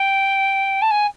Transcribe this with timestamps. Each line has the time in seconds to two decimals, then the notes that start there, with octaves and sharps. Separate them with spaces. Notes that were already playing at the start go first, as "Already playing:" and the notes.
Already playing: G5
0.82 A5
0.91 G#5